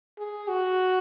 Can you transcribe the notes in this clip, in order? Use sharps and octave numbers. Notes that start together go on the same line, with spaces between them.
G#4
F#4